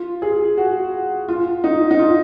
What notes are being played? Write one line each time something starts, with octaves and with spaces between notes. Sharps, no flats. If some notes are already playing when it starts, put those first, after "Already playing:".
Already playing: F4
G#4
F#4
F4
D#4
D#4
F4